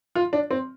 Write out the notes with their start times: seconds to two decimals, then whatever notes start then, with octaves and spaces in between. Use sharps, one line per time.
0.15 F4
0.33 D4
0.51 C4